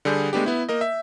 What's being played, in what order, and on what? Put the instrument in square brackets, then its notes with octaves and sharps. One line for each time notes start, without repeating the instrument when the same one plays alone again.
[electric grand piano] D3 G3 G#4 G6
G#3 A3 B3 D4 G4
B3 E4
A#3 A#4 D#5
E5